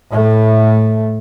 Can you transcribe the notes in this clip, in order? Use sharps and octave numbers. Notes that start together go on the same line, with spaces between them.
A2 A3